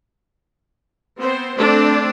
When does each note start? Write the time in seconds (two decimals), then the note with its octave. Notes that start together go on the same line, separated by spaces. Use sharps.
1.21 B3 C4 C5
1.57 A3 C4 D4 A4 D5